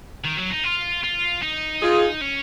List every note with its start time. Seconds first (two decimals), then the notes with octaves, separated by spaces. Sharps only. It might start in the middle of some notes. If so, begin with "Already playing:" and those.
0.24 D#3
0.37 F#3
0.50 D#4
0.64 F4
1.03 F4
1.42 D#4
1.82 F4 G#4
2.21 C#4